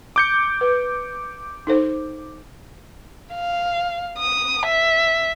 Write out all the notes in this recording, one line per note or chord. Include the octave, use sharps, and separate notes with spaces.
D6 G6 C#7
B4
D#4 A4 C5
F5
D#6
E5